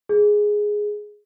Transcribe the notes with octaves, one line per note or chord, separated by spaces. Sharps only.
G#4